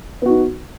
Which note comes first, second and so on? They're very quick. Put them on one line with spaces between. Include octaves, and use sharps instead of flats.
B3 F#4 D#4